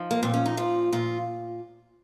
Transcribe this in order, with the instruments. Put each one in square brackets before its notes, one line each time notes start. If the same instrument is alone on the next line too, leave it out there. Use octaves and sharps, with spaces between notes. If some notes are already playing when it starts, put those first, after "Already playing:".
Already playing: [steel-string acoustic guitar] F3 D#4
A#3
A#2 C4
C#4
D#4
F3 F4
A#2 F4